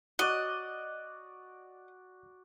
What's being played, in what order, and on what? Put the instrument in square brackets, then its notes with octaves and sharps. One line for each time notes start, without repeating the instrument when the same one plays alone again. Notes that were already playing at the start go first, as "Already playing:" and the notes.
[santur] F#4 D5 [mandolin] D#5 [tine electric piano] F#6